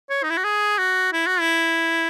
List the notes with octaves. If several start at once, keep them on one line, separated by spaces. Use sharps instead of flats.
C#5
D#4
E4
F#4
G#4
F#4
E4
F#4
E4